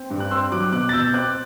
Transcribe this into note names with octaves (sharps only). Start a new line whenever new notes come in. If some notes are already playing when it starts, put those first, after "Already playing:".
Already playing: C4
G2
F#6
C4 C6 E6
F#3 D6 F#6
B2 D6 F#6
A6
B2 E6 G6
C4 D6 F#6